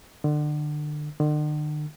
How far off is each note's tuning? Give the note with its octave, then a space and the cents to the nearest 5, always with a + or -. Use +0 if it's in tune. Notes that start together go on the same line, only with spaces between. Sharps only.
D3 +30
D3 +45